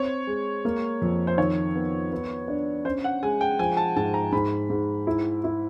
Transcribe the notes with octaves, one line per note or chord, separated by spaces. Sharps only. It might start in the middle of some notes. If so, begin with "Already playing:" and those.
Already playing: C4 C#5
G#3
A#3
F2
C5
D#3 C#5
B3
B3
D4
C#4 C5
F#5
G#3 G#5
G5
F3 G#5
A5
G#2 A5
A#5
G#2 B5
G#2
E4
E4